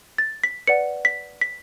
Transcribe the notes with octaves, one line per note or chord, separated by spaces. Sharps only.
A6
B6
B4 D5 F#5 C#7
B6
B6